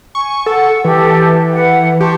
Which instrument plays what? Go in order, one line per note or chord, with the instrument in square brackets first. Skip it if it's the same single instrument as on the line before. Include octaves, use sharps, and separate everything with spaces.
[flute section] G#5 [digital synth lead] C#6
[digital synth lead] A4 [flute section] F#5
[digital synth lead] E3 [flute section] G4 A4
[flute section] B4 F#5
[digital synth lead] G4 [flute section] A5 C6 C#6